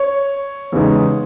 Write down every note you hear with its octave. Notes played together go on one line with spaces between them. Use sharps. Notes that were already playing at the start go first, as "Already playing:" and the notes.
Already playing: C#5
E2 C#3 G#3 D#4